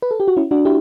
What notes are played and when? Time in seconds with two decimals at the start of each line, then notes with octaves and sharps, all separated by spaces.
0.02 B4
0.11 A4
0.20 G4
0.28 F#4
0.37 C#4 E4
0.51 D4 F#4
0.65 E4 G4